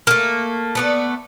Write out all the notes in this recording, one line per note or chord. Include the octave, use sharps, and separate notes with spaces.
A3 A#3
A3 B3 D5